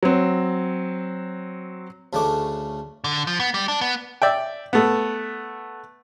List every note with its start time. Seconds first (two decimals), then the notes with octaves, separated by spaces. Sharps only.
0.03 F#3 C4
2.13 D2 C#3 A3 C#4 D4 D6
3.04 D3
3.27 F3
3.39 B3
3.54 G3
3.68 D4
3.81 B3
4.22 D5 E5 G5
4.73 A3 B3